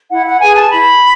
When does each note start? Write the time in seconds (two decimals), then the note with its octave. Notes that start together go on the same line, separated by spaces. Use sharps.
0.11 E4 F#5
0.25 F#5
0.41 G#4 B4 G#5
0.56 A5
0.70 E4 B5